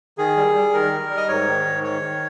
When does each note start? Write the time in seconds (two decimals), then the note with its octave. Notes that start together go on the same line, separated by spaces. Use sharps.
0.18 D#3 G#4
0.37 G3
0.55 G3
0.73 D#3 A#4
0.92 G3
1.10 G3
1.17 D#5
1.28 G#2 C#5
1.47 D#3
1.65 G#2
1.83 D#3 C#5
2.02 D#3